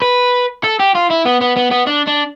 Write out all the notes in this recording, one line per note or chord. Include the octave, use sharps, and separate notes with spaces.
B4
A4
G4
F4
E4
B3
B3
B3
B3
D4
D4